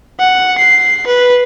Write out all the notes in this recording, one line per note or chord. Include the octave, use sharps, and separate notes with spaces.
F#5
C7
B4